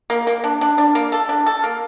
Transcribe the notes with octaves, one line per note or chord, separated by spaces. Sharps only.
A#3
A#3
D4
D4
D4
A#3
A4
D4
A4
A#3